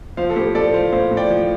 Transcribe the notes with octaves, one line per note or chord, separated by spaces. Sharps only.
F3 C5 F5
A4
A2 G4 C5
A2 A4 D5
F3 C5 F5
A2 C5 F5
A2
D5 G5
F3